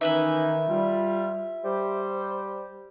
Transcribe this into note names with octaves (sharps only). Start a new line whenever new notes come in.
D#3 E3 C#4 D#4 E4 B4 E5
G3 F4
G3 G4 C5